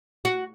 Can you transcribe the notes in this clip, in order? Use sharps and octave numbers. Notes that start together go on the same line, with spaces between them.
F#4